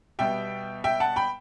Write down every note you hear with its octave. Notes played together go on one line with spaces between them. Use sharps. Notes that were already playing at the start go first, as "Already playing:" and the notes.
B2 G3 B3 E5 G5
E5 G5
F#5 A5
G5 B5